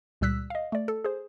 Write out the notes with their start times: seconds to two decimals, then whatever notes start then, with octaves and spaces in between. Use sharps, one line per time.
0.21 C#2 A#2 G3 E6 F#6 B6
0.50 D#5 F5
0.72 A3 D5
0.88 A4
1.04 G#4 C5